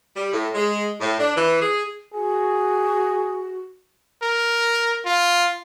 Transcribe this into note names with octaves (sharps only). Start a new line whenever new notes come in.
G3
A2
G#3
A2
D4
E3
G#4
F#4 G#4
A#4
F4